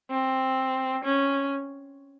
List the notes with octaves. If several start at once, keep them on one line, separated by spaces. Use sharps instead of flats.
C4
C#4